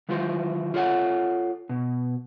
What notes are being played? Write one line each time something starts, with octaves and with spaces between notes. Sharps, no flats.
D#3 E3 F#3 F4 F#4 C5
F4 A4 C#5 F#5
B2